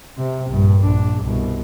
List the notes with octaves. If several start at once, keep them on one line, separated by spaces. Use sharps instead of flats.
C3
A#1 G2
A#1 D4
C2 B2